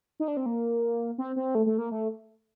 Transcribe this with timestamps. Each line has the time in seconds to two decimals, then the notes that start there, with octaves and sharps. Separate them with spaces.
0.20 D#4
0.28 D4
0.37 C4
0.46 A#3
1.18 C4
1.36 C4
1.55 A3
1.66 A3
1.78 A#3
1.91 A3